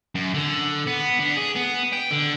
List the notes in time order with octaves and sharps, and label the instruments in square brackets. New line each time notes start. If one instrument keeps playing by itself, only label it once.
[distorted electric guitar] F#2
D3
B3
D3
G#4
B3
G5
D3